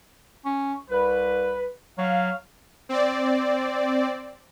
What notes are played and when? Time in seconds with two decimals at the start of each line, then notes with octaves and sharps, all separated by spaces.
0.45 C#4
0.89 C2 B4
1.98 F#3 F5
2.89 C4 D5